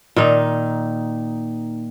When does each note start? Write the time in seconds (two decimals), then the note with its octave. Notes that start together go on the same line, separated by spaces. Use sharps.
0.16 A#2 D#3 D#4